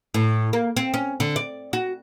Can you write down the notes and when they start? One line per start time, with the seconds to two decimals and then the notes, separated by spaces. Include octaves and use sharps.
0.14 A2
0.53 A#3
0.77 C4
0.94 C#4
1.20 D3
1.36 D5
1.73 F#4